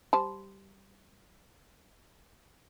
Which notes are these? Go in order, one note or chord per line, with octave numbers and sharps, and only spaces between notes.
G3 C5 A5